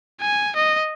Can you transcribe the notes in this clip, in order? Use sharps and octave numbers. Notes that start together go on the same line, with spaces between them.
G#5
D#5